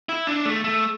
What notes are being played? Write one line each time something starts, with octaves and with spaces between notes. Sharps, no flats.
E4
D4
A3
A3